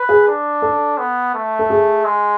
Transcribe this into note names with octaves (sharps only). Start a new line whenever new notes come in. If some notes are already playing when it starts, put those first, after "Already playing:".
Already playing: B4
G#4
D4
A4
B3
A3
A4
G#4
G#3